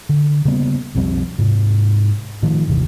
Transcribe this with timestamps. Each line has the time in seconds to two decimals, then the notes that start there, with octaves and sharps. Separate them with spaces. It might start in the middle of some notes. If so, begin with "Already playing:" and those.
0.09 D3
0.45 C#3 G3 A#3 B3
0.95 B1 F2 G3 C4
1.38 G#2 C3
2.42 A2 D#3 F3
2.67 G#1 D#2 C3 E3